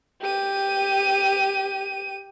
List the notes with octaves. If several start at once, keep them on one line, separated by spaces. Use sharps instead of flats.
G4 D#7